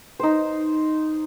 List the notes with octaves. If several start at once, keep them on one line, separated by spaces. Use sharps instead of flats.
D#4 C5